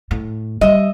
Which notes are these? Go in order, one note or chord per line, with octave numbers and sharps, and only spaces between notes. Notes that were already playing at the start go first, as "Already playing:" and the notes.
A2
G3 D#5 E5